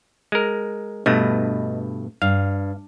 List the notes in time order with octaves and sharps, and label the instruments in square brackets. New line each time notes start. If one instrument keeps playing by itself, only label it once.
[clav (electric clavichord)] G#3 A#4
[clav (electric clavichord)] G2 B2 A3 [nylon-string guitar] D#5
[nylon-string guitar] G2 [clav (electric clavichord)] F5